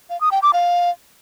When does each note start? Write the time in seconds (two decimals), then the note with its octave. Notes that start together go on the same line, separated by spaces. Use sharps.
0.10 F5
0.21 D#6
0.32 G5
0.43 D6
0.53 F5